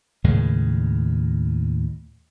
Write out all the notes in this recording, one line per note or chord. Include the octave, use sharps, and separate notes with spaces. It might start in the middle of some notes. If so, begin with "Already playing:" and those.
D#2 A2 C#3 G#3